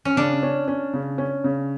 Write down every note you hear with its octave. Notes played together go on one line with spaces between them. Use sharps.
C#4
C#3 D4
C#4
C#4
C#3
C#4
C#3